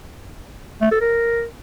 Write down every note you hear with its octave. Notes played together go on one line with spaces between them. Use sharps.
A3
A4
A#4